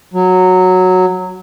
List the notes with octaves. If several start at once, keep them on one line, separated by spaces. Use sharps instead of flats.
F#3